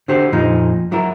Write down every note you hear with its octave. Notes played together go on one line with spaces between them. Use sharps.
D3 F#4 G4 C5
F2 A#2 F3 D#4
F#3 E4 A#4